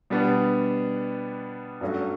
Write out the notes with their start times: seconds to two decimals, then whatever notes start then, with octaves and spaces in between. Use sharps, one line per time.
0.10 B2 G3 B3 D4
1.81 G2 F#3 A3 C#4 F#4